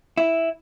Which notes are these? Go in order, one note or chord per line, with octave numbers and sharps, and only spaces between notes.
E4